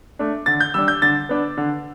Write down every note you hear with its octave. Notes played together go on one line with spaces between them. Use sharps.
A3 D4
D3 A6
G6
G3 D4 E6
G6
D3 A6
B3 D4
D3